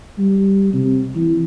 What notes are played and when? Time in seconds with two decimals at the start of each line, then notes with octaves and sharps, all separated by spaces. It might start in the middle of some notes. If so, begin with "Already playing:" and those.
0.18 G3
0.74 C3
1.15 E3